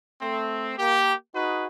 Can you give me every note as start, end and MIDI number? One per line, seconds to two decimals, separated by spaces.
0.22 0.75 57
0.22 0.75 60
0.78 1.14 58
0.78 1.14 67
1.35 1.66 63
1.35 1.66 66
1.35 1.66 68
1.35 1.66 71